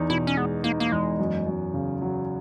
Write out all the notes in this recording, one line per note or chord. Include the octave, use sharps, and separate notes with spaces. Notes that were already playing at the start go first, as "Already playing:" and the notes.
Already playing: E2 D#4
B2 E4
C#4
G#3 B3
A#3 D#4
A#3
E2 G#3
F#2
F#2
C#3
F#3